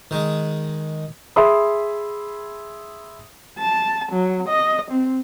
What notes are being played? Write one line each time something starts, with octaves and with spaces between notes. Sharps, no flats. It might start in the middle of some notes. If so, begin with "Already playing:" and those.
D#3 G#3
G#4 E5 B5 C6 D#6
A5
F#3
D#5
C4